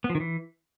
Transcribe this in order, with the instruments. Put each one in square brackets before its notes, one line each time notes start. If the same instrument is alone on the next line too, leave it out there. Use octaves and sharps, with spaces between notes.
[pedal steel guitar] B3
F3
D#3
E3